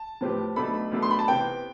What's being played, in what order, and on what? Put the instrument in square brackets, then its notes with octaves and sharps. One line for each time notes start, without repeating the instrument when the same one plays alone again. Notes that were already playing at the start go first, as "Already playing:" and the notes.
Already playing: [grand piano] A5
[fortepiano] A2 F3 C4 G4 B4
[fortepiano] B1 B2 A3 D4 A4 [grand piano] B5
[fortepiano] B1 B2 A3 D4 A4
[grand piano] C6
B5
A5
[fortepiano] C3 E3 B3 [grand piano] G5